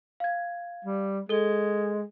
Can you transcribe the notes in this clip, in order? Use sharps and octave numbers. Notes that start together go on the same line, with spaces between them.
F5 G#6
G3
G#3 A4 G7